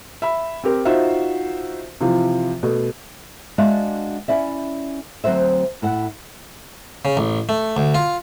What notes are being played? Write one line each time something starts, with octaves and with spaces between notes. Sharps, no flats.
E5 B5
C4 G4 A#4
D#4 F4 F#4 C5 E5 F#5
C3 E3 F3 F4
B2 A3
G#3 D4 F#4 D5 E5 F5
C#4 E4 D5 E5
D2 F#3 C4 F#4 C5 E5
A2 E4 F#5
C#3
A1
A3
D2
F4